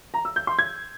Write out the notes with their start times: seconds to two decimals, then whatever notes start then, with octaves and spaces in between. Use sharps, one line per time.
0.14 A#5
0.25 E6
0.36 G6
0.47 C6
0.59 G#6